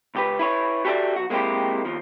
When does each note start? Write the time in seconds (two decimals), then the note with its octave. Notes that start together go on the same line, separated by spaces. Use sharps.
0.15 C#2 G4 B4
0.39 E4 B4 C#5
0.85 F#4 G4 A4 B4 D5 E5
1.16 B1 F#4
1.30 G#3 A#3 C4 C#4 E4 G4
1.85 D#2 F3